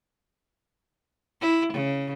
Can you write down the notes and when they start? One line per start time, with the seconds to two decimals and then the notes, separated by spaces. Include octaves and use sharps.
1.41 E4
1.73 C#3